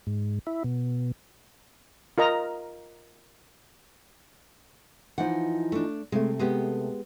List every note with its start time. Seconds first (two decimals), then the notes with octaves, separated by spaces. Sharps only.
0.07 G#2
0.47 E4
0.64 B2
2.18 F4 A#4 D#5 A#5
5.18 E3 F3 D#4 F#5
5.72 A3 D4
6.12 C3 G#3 A3
6.39 G#3 B3 G4